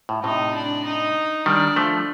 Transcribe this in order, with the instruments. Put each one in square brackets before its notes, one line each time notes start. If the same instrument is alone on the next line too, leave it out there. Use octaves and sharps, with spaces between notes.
[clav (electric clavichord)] A2
[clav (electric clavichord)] A2 C3 [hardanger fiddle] D#4
[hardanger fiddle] D4
D#4
[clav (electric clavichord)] D#3 G3 [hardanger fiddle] D4
[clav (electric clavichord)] F3 A3